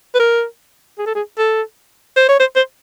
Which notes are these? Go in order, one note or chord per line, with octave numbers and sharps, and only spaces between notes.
B4
A#4
G#4
A4
G#4
A4
C5
C#5
C5
C5